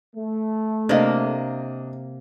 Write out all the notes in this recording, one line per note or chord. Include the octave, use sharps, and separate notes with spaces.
A3
C3 A#3 D4 D#5